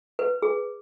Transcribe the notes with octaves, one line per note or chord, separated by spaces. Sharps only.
B4
G#4